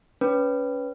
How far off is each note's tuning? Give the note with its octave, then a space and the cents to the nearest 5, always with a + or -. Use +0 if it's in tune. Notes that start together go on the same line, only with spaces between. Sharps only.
C#4 +20 B4 +5